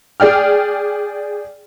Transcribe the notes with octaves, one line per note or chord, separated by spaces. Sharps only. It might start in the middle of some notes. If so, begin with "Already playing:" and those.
G#4 D5 G5 F6